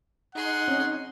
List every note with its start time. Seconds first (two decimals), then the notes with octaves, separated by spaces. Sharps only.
0.35 D#4 G#4 F#5 C6
0.68 C4 C#4